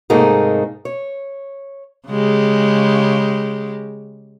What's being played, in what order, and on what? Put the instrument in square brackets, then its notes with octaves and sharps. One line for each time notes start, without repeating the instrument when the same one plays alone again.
[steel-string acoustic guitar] G#2 C3 A3 A#3 D#4 G#4
C#5
[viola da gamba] C#3 G#3 G4